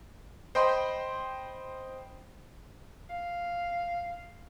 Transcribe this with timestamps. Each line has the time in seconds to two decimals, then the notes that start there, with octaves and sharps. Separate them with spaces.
0.55 C5 D#5 G5 B5 C6
3.09 F5